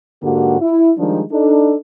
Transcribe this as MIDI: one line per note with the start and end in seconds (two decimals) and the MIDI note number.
0.22 0.60 44
0.22 0.60 50
0.22 0.60 58
0.22 0.60 66
0.22 0.60 67
0.60 0.90 64
0.98 1.22 51
0.98 1.22 53
0.98 1.22 55
0.98 1.22 56
0.98 1.22 62
0.98 1.22 63
1.32 1.75 62
1.32 1.75 63
1.32 1.75 69